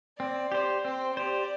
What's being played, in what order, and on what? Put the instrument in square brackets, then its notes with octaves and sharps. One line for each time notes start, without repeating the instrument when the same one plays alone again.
[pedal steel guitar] C4 [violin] D5
[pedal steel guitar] G4 C5 [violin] D5
[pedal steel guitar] C4 [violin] C5
[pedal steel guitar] G4 C5 [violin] D5